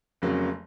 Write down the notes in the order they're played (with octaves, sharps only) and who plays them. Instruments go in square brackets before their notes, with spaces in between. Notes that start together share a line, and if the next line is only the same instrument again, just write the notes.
[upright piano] F1 F2 C#3 F#3 A#3